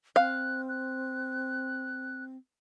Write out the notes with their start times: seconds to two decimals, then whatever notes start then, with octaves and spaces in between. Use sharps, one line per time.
0.16 C4 F5 F#6
0.69 F#6